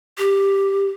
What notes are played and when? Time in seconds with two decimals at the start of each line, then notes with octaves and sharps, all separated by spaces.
0.18 G4